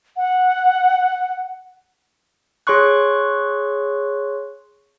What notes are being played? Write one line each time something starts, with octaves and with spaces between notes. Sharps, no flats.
F#5
G#4 C#5 C6 C#6 F#6